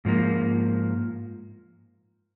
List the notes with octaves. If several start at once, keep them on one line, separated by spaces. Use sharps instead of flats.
G#2 F3 A#3